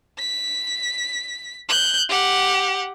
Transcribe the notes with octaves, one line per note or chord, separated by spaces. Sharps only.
B6
F#6 G6
G4 F#5